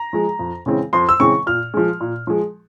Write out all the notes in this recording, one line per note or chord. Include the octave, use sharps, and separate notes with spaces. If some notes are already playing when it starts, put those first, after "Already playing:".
Already playing: A#5
F3 G#3
F2
C#3 E3 G#3 C4
F2 C6
E6
C#3 E3 G#3 C4 C#6
A#2 F6
F3 G#3
A#2
F3 G#3